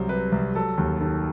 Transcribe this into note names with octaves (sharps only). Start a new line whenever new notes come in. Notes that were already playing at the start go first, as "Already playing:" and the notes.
Already playing: C2 F#3 C5
C3 B4
C2
F#3 A4
D#2
D#3 A4